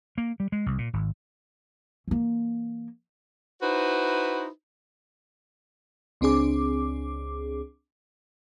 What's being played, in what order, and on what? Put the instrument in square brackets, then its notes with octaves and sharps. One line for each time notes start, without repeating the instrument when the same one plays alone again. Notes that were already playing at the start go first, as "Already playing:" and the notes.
[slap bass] A#3
G3
G#3
C2
A#2
G#1
[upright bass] E3 A#3
[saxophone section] D#4 E4 F#4 B4 C5
[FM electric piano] C#2 C4 D4 G#4 D6